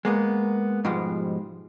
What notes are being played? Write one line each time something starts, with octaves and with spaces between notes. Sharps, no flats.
G#3 A#3 B3
G#2 B2 F3 G3 G#3